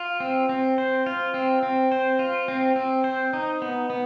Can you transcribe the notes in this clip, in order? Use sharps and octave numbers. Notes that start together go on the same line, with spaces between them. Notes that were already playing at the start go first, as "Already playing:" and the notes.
Already playing: F4
C4
C4
C5
F4
C4
C4
C5
F4
C4
C4
C5
D#4
B3
B3